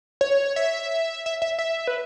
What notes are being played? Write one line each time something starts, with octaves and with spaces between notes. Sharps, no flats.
C#5
E5
E5
E5
E5
B4